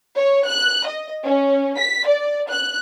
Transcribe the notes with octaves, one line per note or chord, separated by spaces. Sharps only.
C#5
F#6
D#5
C#4
B6
D5
F#6